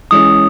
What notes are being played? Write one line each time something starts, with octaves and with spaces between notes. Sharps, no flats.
E3 G#3 C#4 D#6